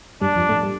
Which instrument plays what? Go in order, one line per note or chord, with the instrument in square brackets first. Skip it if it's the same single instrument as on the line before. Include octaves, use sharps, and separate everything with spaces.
[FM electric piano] G2 G3 [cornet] D4
[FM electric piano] F2 F3
A2 A3
G3